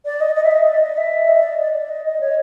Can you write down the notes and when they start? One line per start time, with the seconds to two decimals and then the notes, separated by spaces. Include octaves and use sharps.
0.05 D5
0.20 D#5
0.35 D#5
0.43 E5
0.51 D#5
0.66 D5
0.82 D#5
0.97 E5
1.27 D#5
1.42 D5
1.59 D5
1.73 D5
1.88 D#5
2.04 D#5
2.20 C#5